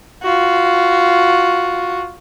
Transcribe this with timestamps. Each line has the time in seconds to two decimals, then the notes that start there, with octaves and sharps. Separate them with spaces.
0.23 F4 F#4